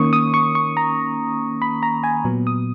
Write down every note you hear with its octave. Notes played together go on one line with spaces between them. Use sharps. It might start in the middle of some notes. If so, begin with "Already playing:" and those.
Already playing: D#3 A#3 C#4 C#6 D#6
D#6
C#6
C#6
A#5
B5
A#5
G#5
A#2 F#3 B3
D#6